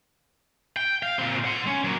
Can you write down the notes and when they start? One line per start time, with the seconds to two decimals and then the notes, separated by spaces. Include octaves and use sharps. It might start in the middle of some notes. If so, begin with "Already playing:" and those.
0.76 G5
1.03 F5
1.19 A#2 C4
1.45 F#5 C6
1.67 C#4
1.84 F#3 A#3